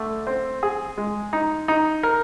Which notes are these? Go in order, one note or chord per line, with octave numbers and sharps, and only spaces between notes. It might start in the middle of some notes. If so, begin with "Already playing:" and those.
Already playing: D3 A3
C4
G#4
G#3
D#4
D#4
A#4